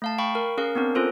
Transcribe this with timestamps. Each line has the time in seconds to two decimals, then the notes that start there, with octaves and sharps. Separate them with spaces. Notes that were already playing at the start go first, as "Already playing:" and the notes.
0.02 A3 F5 A5
0.18 F5 G5 B5 C#6
0.35 A#4
0.57 C#4 G#4 A#4 F5
0.75 B3 C4 D4 A#4
0.95 C#4 F4 A4 C5